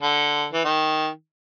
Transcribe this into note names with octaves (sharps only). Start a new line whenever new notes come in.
D3
E3
D#3